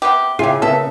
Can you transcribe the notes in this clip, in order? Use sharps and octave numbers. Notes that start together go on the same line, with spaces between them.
C3 B3 G4
C#3 E4 F4 G4 G#4
C#3 A#3 B3 A4 E5